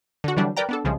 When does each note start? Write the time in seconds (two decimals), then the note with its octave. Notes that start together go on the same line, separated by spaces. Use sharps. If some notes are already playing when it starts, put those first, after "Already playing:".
0.24 D3 F#4
0.37 D3 E3 F#3 G3 D4
0.57 A#4 B4 D5 G5 A#5
0.69 B3 D4 A4
0.85 C2 C#3 F3 G#3